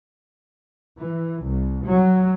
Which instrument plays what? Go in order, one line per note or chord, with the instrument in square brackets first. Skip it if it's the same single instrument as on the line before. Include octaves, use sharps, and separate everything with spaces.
[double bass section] E3
C2
F#3